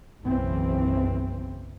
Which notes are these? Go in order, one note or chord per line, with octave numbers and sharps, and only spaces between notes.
F#1 B1 E2 C#3 E3 C4